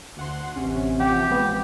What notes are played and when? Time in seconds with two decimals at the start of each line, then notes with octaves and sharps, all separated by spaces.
0.17 D2 F#5 C6
0.56 A1 C3 C#4
1.00 A1 F3 G4 F#5 G5
1.30 G#3 B3